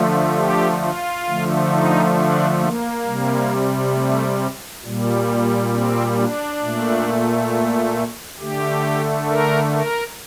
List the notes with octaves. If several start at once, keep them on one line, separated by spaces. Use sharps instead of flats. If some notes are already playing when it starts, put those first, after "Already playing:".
Already playing: D3 F3 A3
G4
F4
D3 F3 A3
D#4
D4
A#3
C3 G3
A3
A#2 G3
C4
D4
A#2 A3
D3 A3 G4
A#4
A#4